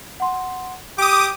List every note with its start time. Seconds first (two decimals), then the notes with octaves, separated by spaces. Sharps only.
0.20 F#5 C6
0.98 G4 G5 D6 D#6